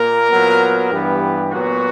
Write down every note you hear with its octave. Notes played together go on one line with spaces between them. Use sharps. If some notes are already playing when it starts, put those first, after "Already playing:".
Already playing: A#2 A#3 A#4
A#2 F#3 B3
G2 E3 B3 G4
A#2 F#3 B3 F#4